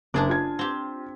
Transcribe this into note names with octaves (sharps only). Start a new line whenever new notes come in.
F#1 D4 G#4 D5
F4 G#6
C4 G4